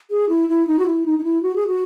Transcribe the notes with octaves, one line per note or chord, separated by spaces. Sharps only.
G#4
E4
E4
D#4
F#4
E4
D#4
D#4
E4
F#4
G#4
F#4